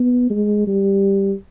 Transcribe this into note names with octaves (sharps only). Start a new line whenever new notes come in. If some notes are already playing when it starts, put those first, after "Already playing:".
Already playing: B3
G#3
G3